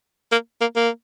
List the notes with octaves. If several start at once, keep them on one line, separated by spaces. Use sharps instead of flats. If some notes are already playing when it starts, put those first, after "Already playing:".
A#3
A#3
A#3